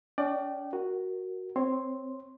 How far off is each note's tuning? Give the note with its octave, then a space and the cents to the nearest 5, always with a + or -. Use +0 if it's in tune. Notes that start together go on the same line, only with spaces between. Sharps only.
C#4 +35 D5 +25 G5 -25
F#4 +0 A#4 +0
C4 +0 C#5 -15 C6 +0